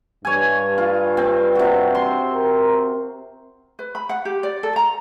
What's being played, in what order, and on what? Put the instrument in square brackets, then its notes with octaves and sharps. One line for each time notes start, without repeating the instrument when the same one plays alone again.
[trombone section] G2 [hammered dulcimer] C#5 G#5
[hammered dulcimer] F4
C4
C3 F#4
C6
[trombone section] A#4
[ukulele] B4
B5
F#5
G4
D5
A4
A#5